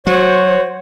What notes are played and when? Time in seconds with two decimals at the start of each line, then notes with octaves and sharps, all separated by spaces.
0.07 F#3 F#4 C5 C#5